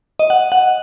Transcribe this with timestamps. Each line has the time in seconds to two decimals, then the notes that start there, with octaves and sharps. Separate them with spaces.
0.19 D#5
0.30 F#5
0.52 F#5